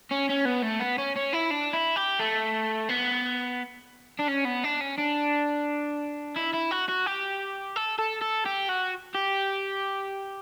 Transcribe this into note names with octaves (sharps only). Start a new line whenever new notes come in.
C#4
C#4
B3
A3
B3
C#4
C#4
E4
D4
E4
G4
A3
B3
D4
C#4
B3
D4
C#4
D4
E4
E4
F#4
F#4
G4
A4
A4
A4
G4
F#4
G4